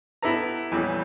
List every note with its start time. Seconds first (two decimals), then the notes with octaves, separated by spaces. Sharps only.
0.22 B3 E4 G4 A4 B4 A#5
0.71 F2 A#2 E3 G3 B3 C#4